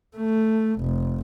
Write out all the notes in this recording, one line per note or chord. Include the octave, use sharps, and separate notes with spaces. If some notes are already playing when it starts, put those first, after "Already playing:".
A3
F1